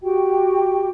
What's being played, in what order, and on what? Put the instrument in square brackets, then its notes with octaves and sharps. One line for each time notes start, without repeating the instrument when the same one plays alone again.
[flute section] F#4 G4 G5